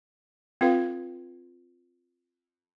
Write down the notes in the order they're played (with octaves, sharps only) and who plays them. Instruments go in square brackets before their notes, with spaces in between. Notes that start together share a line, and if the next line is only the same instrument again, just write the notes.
[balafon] C4 F4 A4 B4 F5